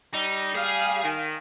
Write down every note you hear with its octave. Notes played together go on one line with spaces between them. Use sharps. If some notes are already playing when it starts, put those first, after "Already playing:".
G3 D#4
G#4 F5
D#3